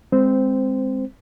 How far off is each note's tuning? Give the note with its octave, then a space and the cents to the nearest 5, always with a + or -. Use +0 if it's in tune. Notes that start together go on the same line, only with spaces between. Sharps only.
G#3 -10 C4 +0 C5 -15